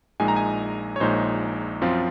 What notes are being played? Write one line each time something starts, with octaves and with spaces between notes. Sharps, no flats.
A#1 A#2 G#3 D#4 G#5
A#5
G#5
C#5
A#1 A#2 G#3 D#4 C5
F#2 F3 C4 F4